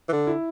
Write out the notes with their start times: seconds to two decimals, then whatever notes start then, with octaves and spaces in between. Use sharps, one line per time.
0.09 E3
0.13 D3
0.27 E4